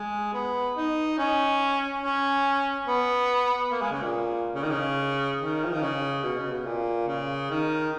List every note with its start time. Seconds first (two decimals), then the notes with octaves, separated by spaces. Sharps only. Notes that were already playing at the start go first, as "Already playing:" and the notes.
Already playing: G#3
0.33 B3
0.76 D#4
1.18 C#4
2.03 C#4
2.87 B3
3.71 A#3
3.81 G#3
3.92 C#3
4.02 A#2
4.55 C#3
4.62 D#3
4.71 C#3
5.40 D#3
5.64 F3
5.73 D#3
5.82 C#3
6.23 B2
6.38 C#3
6.52 B2
6.65 A#2
7.07 C#3
7.50 D#3